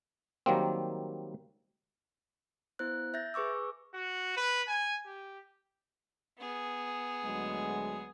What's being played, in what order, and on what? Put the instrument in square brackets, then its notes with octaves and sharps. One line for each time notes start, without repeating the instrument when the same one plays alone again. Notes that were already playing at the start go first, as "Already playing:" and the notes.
[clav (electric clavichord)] D#3 F#3 G3 A#3 C4
[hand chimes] B3 E4 C5 F#6
E5 G6 A6 A#6
G#4 B4 C#6 D6 E6
[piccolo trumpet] F#4
B4
G#5
G4
[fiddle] B3 G#4
[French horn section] D2 F#3 G#3